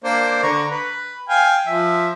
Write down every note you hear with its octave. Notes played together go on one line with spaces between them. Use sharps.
A#3 D4 C5
D3 A#5 C#6
B4
F5 G5 G#5
F3 E5